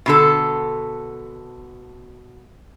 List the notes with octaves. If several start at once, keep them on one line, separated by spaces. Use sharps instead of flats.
B2 D3 A4